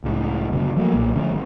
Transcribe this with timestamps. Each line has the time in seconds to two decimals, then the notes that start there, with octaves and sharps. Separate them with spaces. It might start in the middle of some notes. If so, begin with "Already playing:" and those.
0.04 C#2 A2 C#3
0.52 F#1 D2 B2
0.77 F3 F#3 A3 A#3
0.93 B1 A#2
1.15 D3 F3 A3 C#4
1.31 G#1